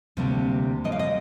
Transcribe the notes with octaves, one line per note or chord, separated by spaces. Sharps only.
D2 C3 G3 A#3 D4
D2 D3 G3 D4 D#5
F5
D#5